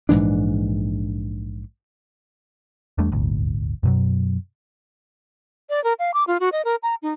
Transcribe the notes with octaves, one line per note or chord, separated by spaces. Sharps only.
A#1 G#2 E3 D4
E2 G3 A3 D4
D#1 G#1 D2
F#2 B2 F#3
D5
A#4
F5
D6
F4
F#4
D#5
A#4
A#5
D#4